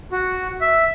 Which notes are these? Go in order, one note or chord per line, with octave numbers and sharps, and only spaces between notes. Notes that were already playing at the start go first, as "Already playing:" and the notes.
F#4
E5